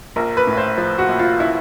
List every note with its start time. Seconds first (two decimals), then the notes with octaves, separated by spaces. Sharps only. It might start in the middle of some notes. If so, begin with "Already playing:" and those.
0.16 A#1 A#4
0.37 B4
0.47 A2
0.57 C5
0.78 F3
0.98 F#4
1.09 A#1
1.19 F4
1.40 E4